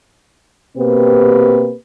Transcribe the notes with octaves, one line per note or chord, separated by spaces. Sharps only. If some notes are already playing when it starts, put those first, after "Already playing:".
B2 A#3 C4 G4 B4